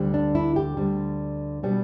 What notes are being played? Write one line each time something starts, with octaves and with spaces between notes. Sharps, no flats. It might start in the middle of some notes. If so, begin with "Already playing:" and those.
Already playing: D2 D3 G3
D4
E4
G4
D2 D3 G3 D4
B2 G3 B3 D4